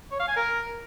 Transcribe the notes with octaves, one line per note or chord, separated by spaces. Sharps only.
C#5
F5
G#5
A#4